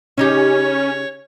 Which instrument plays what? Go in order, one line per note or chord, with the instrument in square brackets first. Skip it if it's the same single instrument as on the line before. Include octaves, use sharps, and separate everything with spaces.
[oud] C#3 D#4 G4 [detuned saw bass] C#4 [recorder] C#5